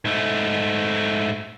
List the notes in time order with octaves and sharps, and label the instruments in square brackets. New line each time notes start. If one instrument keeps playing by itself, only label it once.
[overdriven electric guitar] G#2 A3